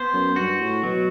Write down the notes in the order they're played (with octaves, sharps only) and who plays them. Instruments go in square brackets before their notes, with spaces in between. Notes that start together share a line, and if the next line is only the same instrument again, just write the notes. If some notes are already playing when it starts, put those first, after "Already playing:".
Already playing: [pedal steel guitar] B3 C5
[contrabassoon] F#2
[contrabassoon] G2 [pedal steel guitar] F#4
[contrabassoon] A2
[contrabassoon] B2 [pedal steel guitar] F#3